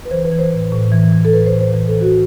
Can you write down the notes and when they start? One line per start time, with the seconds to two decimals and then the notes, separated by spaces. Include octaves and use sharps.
0.05 B4
0.11 E3 C5
0.25 B4
0.32 E3
0.39 C5
0.52 A2
0.72 A2
0.92 E3
1.12 E3
1.25 A4
1.33 A2 B4
1.46 C5
1.53 A2
1.61 C5
1.74 E3
1.88 A4
1.95 E3
2.01 F#4